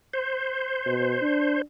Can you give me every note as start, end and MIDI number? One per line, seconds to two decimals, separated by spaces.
0.14 1.62 72
0.86 1.17 47
1.22 1.61 62